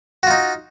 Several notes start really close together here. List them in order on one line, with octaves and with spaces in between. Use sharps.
F#4 F4 D#4